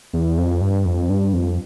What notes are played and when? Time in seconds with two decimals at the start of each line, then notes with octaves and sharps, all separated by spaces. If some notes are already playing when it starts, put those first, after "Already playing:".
0.13 E2
0.38 F2
0.61 G2
0.85 F2
1.10 G2
1.33 F2